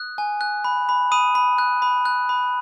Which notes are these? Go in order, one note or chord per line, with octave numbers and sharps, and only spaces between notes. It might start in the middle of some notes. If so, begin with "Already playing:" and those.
Already playing: D#6 F#6
G#5
F#6
B5
B5
B5 D#6 D#7
B5
F#6
B5
F#6
B5